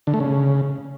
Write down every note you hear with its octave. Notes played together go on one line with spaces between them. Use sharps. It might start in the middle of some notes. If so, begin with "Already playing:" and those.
D3
A3
C#3